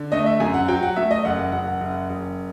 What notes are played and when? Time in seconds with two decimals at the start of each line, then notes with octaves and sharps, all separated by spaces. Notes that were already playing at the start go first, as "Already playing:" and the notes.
Already playing: D3
0.12 A3 D#5
0.26 E5
0.40 F#2 G#5
0.54 F#5
0.68 F#3 G5
0.83 F#5
0.96 A3 E5
1.11 D#5
1.25 F#1 F#5
1.39 F#5
1.52 F#1 F#5
1.67 F#5
1.81 F#1
2.10 F#1